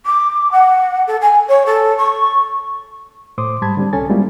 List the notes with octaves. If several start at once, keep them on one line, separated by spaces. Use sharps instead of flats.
D6
F#5
A4
G#5
C#5
A4
C#6
A2 C5 C6 D6 D#6
G#2 G3 A5 B5 G#6
D3 G3 C4
C2 C#4 A4 G#5 A6
G3 G#3 A#3 C4 E4 F4